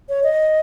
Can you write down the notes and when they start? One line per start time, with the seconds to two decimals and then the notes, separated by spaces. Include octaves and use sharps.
0.09 C#5
0.23 D#5